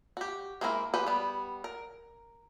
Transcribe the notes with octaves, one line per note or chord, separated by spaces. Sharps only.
F#4 G4
G#3 A#3 C4 E4 A#4
G4 G#4 B4 C5 F#5
G3 B3
A#4